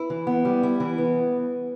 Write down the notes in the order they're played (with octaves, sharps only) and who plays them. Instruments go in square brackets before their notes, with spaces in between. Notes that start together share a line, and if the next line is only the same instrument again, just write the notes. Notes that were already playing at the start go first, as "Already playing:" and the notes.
Already playing: [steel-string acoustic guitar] E4 [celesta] B4
[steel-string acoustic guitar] E3
B3
G3
E4
E3
[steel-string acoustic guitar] B3 [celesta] B4